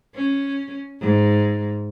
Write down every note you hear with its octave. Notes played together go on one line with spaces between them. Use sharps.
C#4
G#2